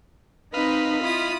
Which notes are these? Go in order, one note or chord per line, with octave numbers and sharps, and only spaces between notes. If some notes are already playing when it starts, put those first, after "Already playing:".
C4 D#4 B4 D#5 F5 B5
E4 F4 D#6